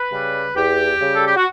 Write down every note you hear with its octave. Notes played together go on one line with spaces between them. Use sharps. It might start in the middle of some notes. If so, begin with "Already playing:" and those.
Already playing: B4
C#3 G3
E2 G4
C#3 G3
A4
G4
F#4